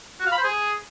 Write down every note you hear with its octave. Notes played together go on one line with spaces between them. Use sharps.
F#4
F5
B5
C5
G#4